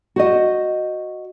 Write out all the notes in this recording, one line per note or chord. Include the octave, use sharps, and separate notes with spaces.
F#4 C5 D#5